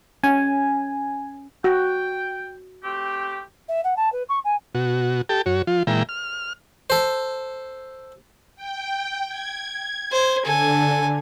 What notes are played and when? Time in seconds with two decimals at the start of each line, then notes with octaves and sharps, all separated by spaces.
0.23 C#4 G#5
1.64 F#4 G5
2.84 A3 C4 G4
3.68 E5
3.84 F#5
3.96 A5
4.12 B4
4.29 C#6
4.44 G#5
4.75 B2 F#4
5.29 G4 A4 G5 A5
5.46 F#2 F#4 C#5
5.67 F3 F4
5.87 A#2 E3 G#3 E5 G5 A#5
6.09 F6
6.90 A4 C5
8.56 G5
9.28 G#6
10.12 C5
10.45 D3 A4 G#5